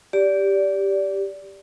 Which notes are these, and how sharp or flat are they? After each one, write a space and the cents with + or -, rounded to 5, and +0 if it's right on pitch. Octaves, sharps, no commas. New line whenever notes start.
G4 +0 D5 -20